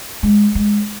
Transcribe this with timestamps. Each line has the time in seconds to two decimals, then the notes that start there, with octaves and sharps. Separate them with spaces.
0.23 G#3
0.55 G#3